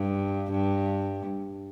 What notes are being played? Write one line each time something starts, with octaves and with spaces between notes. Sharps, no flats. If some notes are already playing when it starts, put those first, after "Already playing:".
Already playing: G2
G2